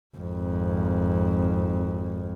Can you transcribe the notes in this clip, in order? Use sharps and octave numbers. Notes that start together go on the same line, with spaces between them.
G#1 F2